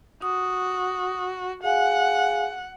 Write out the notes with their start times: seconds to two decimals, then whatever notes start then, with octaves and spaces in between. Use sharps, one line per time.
0.22 F#4 D#6
1.63 G#4 F5 F#5 G#5